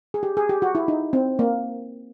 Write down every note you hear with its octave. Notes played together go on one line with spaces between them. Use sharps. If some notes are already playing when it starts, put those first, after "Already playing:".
G#4
G4
G#4
G4
F#4
E4
D#4
C4
A#3